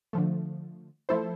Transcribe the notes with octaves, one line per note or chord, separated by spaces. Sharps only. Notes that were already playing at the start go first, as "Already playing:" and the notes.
D3 F3 A3
F3 A3 E4 A4 C5